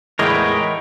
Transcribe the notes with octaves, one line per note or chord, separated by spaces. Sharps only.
E2 A2 G#3 B3 A#4 C#5 D#5 G5